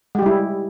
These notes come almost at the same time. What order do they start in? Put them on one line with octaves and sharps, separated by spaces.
G#3 G4 G3 E4